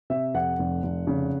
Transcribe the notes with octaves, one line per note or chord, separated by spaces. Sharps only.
C3 E5
F2 F#5
F1
F1
C#3